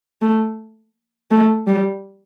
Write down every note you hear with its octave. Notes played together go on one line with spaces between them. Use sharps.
A3
A3
G3